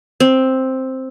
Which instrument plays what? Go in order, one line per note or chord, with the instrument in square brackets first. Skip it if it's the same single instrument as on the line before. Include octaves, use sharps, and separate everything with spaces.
[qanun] C4